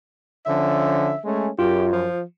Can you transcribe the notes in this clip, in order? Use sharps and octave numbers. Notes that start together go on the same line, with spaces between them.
D3 F3 C#4 E5
G#3 A3 C#4
F#2 F4 G4
F3